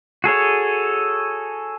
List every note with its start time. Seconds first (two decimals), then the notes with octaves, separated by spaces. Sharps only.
0.24 F#4 G#4 A4 C#5